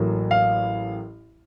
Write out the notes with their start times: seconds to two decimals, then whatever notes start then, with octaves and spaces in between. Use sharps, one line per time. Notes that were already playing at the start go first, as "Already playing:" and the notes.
Already playing: A1 A2 F#3 A#3
0.31 F5